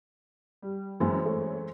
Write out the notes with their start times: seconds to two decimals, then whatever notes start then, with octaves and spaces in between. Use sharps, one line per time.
0.62 G3
1.00 F#2 E3 G#3 C4
1.25 A3 C#5